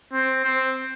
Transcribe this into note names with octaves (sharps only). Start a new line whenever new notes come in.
C4
C4